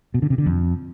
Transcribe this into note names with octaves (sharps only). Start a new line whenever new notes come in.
B2
D3
C3
D3
F2